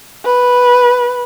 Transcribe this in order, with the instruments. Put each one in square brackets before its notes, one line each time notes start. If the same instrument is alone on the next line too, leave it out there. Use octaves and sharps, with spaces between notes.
[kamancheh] B4